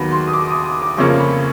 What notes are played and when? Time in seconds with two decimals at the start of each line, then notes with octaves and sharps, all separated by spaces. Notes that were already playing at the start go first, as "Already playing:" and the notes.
Already playing: D#2 D#3 F#3 B3 B5
0.12 C6
0.27 D#6
0.33 D6
0.50 D#6
0.65 D#6
0.82 D6
0.97 F2 C#3 F3 A#3 C#4 C#6
1.20 B5